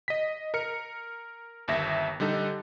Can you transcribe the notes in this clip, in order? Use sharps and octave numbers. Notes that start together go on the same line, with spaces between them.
D#5 B6
A#4 F6 C#7
G1 D#2 E5 A#6
D3 G3 D#4 A4